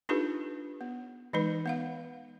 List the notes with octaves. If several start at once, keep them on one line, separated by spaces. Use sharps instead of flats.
D4 D#4 F4 G4 A4 B4
B3
E3 G#3 D#4 B4
B3 F5 F#5